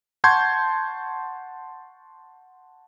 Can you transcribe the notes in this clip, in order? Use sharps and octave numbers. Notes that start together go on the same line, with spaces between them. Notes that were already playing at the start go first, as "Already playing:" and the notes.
F#5 A5 C6 C#6 G6 G#6